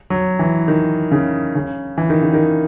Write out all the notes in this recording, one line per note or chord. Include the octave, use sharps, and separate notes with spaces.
F#3
E3
D#3
C#3
C#3
E3
D#3
C#3
D#3